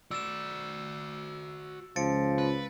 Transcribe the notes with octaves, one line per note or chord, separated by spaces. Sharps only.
F#4 D5 E6 A6 E7
C#2 F3 A6 C#7 D7
B4